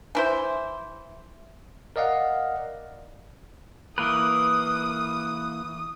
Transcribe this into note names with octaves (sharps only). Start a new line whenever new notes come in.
E3 E4 C5
A#4 D5 D#5 F5 F#5
E3 A#3 B4 D#6